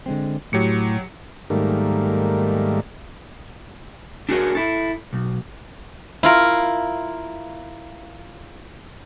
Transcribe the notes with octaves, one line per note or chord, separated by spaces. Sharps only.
D3 G#3 C4
A2 F#3 G4 C#7
G#2 D#3 G3 A3 A#3
D4 F#4 G#4 A#4 B4 C#5
E4 A4
B1
E4 F4 A#4